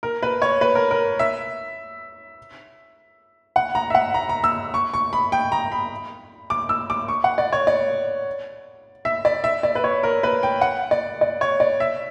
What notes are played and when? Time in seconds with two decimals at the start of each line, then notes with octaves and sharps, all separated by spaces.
0.03 A#4
0.23 B4
0.42 C#5
0.61 B4
0.75 A#4
0.91 A#4
1.19 E5
3.56 F#5
3.75 A#5
3.90 E5
3.95 F#5
4.14 A#5
4.29 A#5
4.44 E6
4.74 C#6
4.94 C#6
5.13 B5
5.32 G5
5.52 A#5
5.72 B5
6.50 D6
6.69 E6
6.90 D6
7.08 C#6
7.24 F#5
7.38 D5
7.53 C#5
7.67 D5
9.05 E5
9.25 D5
9.44 E5
9.63 D5
9.75 B4
9.84 C#5
10.03 A#4
10.23 B4
10.43 G5
10.61 F#5
10.91 D5
11.21 D5
11.41 C#5
11.60 D5
11.80 E5